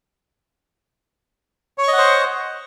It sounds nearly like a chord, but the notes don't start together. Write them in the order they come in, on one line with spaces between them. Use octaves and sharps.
C#5 C#6 D#5 F#5 C5